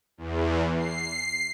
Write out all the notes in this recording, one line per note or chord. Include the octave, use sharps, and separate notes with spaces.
E2
C7